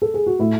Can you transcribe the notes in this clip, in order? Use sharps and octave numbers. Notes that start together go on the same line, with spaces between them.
A4
G#4
F#4
A2 E4